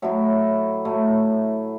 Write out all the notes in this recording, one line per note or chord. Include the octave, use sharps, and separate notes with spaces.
A2 F#3 A3 E4
A2 F#3 A3